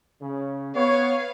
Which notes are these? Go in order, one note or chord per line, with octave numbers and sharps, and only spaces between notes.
C#3
B3 B4 C#5 F5